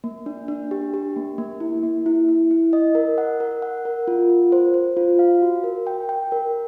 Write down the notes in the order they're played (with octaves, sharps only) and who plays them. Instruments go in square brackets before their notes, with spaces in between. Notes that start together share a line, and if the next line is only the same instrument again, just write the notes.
[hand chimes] A#3
D4
D4
G4
G4
A#3
A#3
E4
A#3
E4
E4
E4
D#5
A#4
F#5
A#4
F#5
A#4
F4
F4
C5
C5
F4
F5
F#4
A#4
G5
G5
A#4